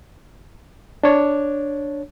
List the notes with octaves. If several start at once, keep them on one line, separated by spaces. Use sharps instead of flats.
D4 C#5